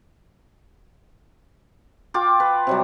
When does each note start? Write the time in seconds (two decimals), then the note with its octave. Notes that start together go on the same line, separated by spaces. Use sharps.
2.14 F4 G5 D6
2.40 B4
2.67 C3 F#3 G3